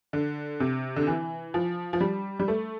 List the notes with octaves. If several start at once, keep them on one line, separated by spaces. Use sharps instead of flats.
D3
C3
D3
E3
F3
F3
G3
G3
A3